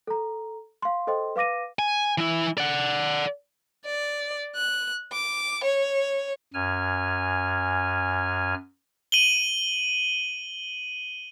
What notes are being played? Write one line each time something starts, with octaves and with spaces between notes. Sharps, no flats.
A4 A#5
F5 C6
A4 C5 D#5 G5 C6
B4 F5 D6 A#6 D#7
G#5
E3 E4
D5 F#5
D5
F#6
D6
C#5
F#2 G#5 F6
D#7 F#7 G7